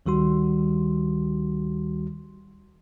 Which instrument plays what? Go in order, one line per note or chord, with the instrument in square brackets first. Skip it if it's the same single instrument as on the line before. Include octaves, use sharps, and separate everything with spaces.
[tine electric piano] D2 D#3 G3 F#4 C6